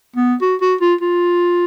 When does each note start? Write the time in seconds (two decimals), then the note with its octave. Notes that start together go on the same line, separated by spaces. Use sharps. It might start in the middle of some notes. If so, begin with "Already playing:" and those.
0.16 B3
0.41 F#4
0.61 F#4
0.81 F4
1.01 F4